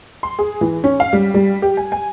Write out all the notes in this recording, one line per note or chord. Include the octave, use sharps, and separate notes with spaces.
C6
G#4
E3
C#4
F5
G3
G3
G4
G#5
G#5